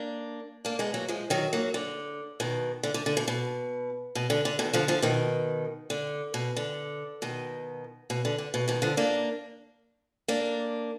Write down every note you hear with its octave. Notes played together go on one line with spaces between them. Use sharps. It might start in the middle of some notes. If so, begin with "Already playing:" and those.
Already playing: A#3 D4
A#3 D4
G#3 B3
F#3 A#3
F3 G#3
D#3 F#3
F#3 A#3
D3
B2 D#3
D3
D3
D3
B2
B2
B2
D3
D3
B2 D#3
D3 F3
D3 F3
B2 D#3
D3
B2
D3
B2 D#3
B2
D3
D3
B2
B2 D#3
D3 F3
A#3 D4
A#3 D4